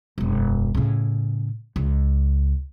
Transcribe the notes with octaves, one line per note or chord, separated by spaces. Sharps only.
E1 F#2
A2 C#3
C#2